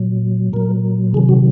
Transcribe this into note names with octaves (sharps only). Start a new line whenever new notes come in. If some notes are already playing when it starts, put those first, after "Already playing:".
Already playing: A#2 F#3
A#2 F#3 A#4
C3 D#3 F#3 G#4
F#4